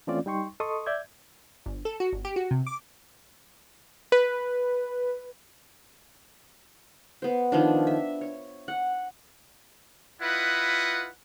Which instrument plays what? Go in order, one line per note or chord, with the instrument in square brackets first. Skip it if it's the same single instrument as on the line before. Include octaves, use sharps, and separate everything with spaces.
[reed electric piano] E3 A3 C4 C#4 F4 D5
G3 D#4 G5 C6 C#6
A4 D#5 C6 C#6 D#6
D5 E5 G6 G#6
[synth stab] G1
A4
F#4
G1
G4
F#4
C3
D6
[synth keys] B4
[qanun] B3 C5
D#3 F3 D4
E5
C#5
F#5
[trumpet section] E4 F4 B4 D#5 F#5